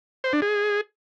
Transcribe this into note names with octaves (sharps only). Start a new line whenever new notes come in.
C5
D4
G#4